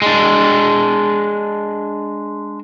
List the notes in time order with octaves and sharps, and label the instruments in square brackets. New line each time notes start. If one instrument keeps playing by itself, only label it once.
[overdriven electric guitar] G#3 D4